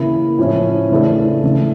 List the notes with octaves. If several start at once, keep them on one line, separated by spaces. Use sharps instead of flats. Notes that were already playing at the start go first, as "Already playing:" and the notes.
Already playing: C#3 E3 A#3 E4
A2 F3 C#4 E4
C#3 E3 A3 D4 A4
C#3 E3 A3